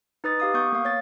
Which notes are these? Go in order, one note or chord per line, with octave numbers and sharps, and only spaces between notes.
D#4 B4 D#6 A6
G4 F5 D#6
B3 C#6 D#6 G6
A#3 F5
C#5 A6